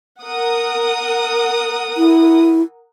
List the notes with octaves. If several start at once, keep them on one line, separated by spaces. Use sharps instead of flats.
A#4 F#5 D#6
E4